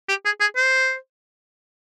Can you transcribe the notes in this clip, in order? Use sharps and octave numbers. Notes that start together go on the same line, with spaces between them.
G4
G#4
G#4
C5